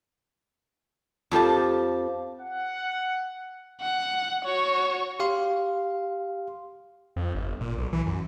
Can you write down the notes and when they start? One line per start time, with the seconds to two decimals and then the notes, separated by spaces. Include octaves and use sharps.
1.31 F2 F3 G4 A5
2.41 F#5
3.81 F#5
4.45 F#4 C#5
5.20 G4 F5 C6
7.16 F2
7.35 G1
7.61 A#2
7.78 B1
7.93 E3
8.06 F#2